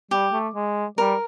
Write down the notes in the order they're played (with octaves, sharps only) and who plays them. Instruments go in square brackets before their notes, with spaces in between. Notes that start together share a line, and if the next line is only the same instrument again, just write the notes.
[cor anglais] G3 [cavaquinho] G4
[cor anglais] A3
G#3
[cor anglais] G3 [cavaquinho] A#4